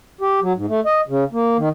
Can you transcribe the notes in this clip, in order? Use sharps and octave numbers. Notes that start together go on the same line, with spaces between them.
G4
F#3
G#2
A3
D#5
C#3
A#3
D#3